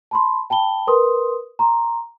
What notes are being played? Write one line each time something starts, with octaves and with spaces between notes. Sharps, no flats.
A5 B5 C6
G5 A5 B5 G7
A#4 B4 C6 D#6
A#5 C6